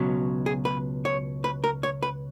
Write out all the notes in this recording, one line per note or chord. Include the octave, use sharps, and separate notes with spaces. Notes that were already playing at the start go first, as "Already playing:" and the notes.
Already playing: C#2 B2 F#3 C#4
G#4
B4
C#5
B4
A#4
C#5
B4